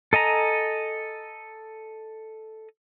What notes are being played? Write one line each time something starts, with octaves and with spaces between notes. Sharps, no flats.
A4 D#5 G#5 A#5